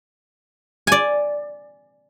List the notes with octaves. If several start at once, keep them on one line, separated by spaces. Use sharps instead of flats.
D5 G#5